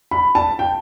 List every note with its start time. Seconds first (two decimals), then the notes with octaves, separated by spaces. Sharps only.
0.11 B5
0.35 A5
0.59 G5